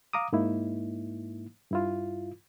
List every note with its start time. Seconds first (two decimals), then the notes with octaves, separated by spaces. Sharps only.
0.13 F5 A#5 D6 D#6
0.32 G#2 A#3 D#4 E4
1.71 G2 E4 F4